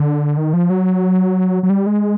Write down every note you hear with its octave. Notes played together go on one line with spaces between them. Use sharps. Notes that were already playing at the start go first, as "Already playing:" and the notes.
Already playing: D3
D#3
F3
F#3
F#3
G3
G#3